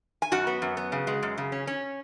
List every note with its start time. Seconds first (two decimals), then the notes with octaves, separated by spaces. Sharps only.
0.22 G#5
0.32 F#2 F#4 F#5
0.47 B3
0.62 F#2
0.77 B3
0.92 C#3
1.07 G#3
1.23 F#2
1.38 C#3
1.52 C#4
1.67 C#4